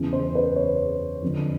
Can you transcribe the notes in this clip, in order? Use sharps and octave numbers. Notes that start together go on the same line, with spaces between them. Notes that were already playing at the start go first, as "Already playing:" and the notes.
Already playing: E2 C#3 E3
C5
B4
C#5
F2 D3